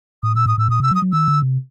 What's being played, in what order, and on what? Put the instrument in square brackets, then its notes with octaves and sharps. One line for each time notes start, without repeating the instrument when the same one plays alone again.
[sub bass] A2 [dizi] D#6
[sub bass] A#2 [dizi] E6
[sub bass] A2 [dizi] D#6
[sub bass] A2 [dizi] E6
[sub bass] A#2 [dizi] D#6
[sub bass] C3 [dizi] E6
[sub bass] F#3
[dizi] D#6
[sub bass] F#3
[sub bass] D#3 [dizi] E6
[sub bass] D3
C3